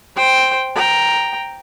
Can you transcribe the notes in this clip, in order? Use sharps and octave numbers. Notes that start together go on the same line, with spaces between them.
C5 G5
G5 A#5